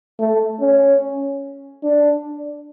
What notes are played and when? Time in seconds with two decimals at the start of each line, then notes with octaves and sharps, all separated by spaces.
0.19 A3
0.61 C#4
1.83 D4